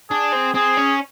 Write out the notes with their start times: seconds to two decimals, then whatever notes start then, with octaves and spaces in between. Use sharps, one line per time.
0.10 D4 G#4
0.33 C4
0.54 C4 G#4
0.77 C#4